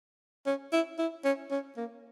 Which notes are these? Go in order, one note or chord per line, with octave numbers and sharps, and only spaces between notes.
C#4
E4
E4
C#4
C#4
A#3